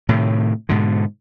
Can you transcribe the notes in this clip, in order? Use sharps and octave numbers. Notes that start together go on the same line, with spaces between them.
A2 C3 D#3
G#2 B2 D3